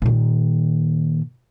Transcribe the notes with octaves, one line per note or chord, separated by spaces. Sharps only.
A#2 D#3